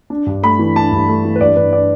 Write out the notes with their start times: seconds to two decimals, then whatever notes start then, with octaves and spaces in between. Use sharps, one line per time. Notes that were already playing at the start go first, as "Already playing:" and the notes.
0.10 D4
0.26 G2
0.43 A3 B5
0.59 E3
0.76 D4 A5
0.92 G2
1.08 A3
1.25 E3
1.35 B4
1.40 G2 D5
1.56 G2 B4
1.73 D4 D5